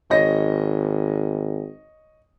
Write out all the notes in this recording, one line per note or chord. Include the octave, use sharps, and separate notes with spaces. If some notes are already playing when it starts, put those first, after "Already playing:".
G#1 C#5 D#5 A#6